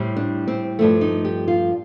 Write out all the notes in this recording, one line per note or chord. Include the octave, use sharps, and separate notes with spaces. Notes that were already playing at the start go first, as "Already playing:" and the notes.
Already playing: A2 G3 C4
D4
C4
G2 F3 A3
D#4
G4
F4